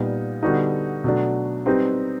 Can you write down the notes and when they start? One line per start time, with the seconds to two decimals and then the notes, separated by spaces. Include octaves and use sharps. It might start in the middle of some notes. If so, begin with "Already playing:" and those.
Already playing: A#2 G3 B3 D#4
0.43 D3 G3 B3 D#4 F#4
1.04 B2 F#3 A3 D4
1.66 G3 C4 D#4 G4 B4